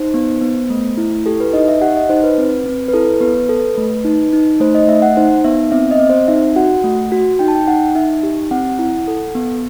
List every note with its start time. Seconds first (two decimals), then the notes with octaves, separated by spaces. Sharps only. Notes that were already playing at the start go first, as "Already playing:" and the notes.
Already playing: D#4 C5
0.14 B3
0.42 B3
0.70 A3
0.97 E4
1.26 G4 A4
1.40 B4
1.53 D#4 D#5
1.68 E5
1.81 G4 F#5
1.96 D#5
2.10 D#4 C5
2.24 B4
2.38 C4
2.66 C4
2.88 B4
2.93 E4 A4
3.21 B3 B4
3.49 A4
3.77 A3
4.05 D#4
4.33 D#4
4.60 A3 C5
4.75 D#5
4.88 A3 E5
5.02 F#5
5.17 D#4 C5
5.44 B3 E5
5.72 C4 E5
5.91 D#5
6.00 C4
6.10 C5
6.28 D#4 E5
6.56 F#4 F#5
6.84 A3
7.12 F#4
7.39 D#4 G5
7.48 A5
7.55 G5
7.68 D#4 F#5
7.95 D#4 E5
8.23 G4
8.51 C4 F#5
8.79 E4
9.08 A4
9.35 B3